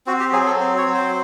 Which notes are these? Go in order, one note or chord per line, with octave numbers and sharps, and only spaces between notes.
C4 F#4
G4
F#3 G#4
A4
C4
C#5
F#3
C5